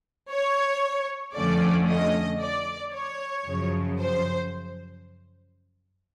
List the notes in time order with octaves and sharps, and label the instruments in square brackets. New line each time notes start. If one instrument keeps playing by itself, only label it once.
[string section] C#5
F2 D3 F3 A3 C#4 D5
D#5
D5
C#5
F#2 C#3 F3
C5